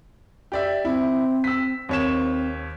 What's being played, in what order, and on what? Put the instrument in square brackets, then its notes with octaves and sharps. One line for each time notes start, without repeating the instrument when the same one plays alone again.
[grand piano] G4 D5 E5
[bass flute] C4 [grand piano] E4
[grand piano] E6 B6
[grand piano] D#2 C#5 E7 [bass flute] C4